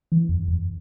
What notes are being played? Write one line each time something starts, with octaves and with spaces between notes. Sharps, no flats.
E3
F2
F2